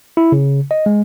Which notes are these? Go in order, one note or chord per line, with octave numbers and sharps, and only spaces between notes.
E4
C#3
D#5
G#3